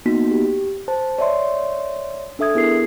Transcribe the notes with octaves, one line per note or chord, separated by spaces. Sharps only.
A#3 B3 D#4 F#4 B6
G4
C5 A5
C#5 D5 E5 C6
D4 A4 E5 D#6 G#6
B3 E4 G#4 A#4 C7